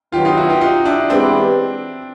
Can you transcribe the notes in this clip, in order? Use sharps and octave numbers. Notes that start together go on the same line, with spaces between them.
D#3 F#3 B3 F4 G4
D#4 F4
E4 F#4
F4 G4
D#4 F4
D4 E4
E3 G#3 B3 C4 D4 E4 G4